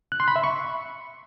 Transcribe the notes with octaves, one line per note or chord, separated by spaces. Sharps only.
F#6
C6
B5
E5
C#6